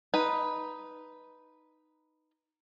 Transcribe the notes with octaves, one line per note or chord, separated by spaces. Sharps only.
D#4 B4